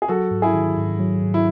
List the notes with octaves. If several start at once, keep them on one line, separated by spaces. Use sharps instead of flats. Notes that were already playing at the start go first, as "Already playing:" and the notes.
G#4
F#3 F#4 A4
G#2
E4 G#4
D#3
G#2
F#3
G#2
E4